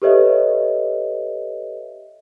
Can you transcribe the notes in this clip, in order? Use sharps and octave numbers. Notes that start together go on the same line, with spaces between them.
G4 A4 B4 C#5 D#5 E5